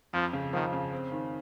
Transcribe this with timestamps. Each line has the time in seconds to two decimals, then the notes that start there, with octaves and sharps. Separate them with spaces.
0.13 F2 F3
0.33 C#3
0.53 D#3 F3
0.73 C#3
0.92 C4
1.12 D#3